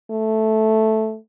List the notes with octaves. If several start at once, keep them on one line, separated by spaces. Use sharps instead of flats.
A3